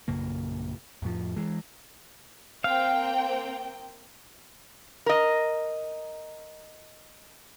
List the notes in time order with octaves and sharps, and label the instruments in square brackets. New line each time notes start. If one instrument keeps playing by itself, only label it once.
[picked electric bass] A#1 F#2 C#3 A#3
F2 A2 F3
E3 G#3
[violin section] A#3 C4 G5 [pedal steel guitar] F5
[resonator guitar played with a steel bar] A#4 D#5